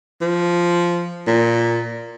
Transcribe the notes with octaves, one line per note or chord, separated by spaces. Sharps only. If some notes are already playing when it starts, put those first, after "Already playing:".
F3
A#2